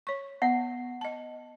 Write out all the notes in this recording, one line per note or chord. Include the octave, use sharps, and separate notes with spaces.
C#5 C#6
B3 F#5
D#5 A5